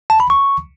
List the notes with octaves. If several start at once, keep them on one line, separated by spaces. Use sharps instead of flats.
A5
B5
C#6